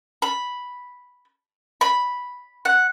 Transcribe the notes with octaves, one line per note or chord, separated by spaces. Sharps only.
B5
B5
F#5